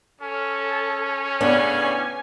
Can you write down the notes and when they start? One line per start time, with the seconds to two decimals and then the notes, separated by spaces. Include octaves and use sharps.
0.22 C#4 A4
1.41 A2 C#3 B3 D4 D5 G#5